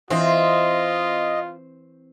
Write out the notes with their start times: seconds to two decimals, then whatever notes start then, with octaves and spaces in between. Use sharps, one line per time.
0.10 E3 C4 F4 D#5